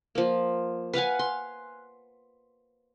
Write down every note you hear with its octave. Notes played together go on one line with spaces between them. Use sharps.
F3 A#3
B4 F5 F#5 G#5
C6